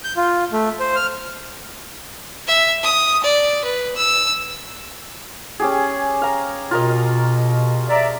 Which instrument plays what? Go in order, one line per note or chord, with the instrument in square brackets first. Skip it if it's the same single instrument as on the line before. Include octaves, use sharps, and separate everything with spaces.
[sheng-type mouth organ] G6
F4
A3
C5
F6
[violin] E5
D#6
D5
B4
E6
[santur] C#4 G4 G#4
F5 A#5
[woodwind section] B2 [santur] F4 A#4 D#5
[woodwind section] D5 E5 A#5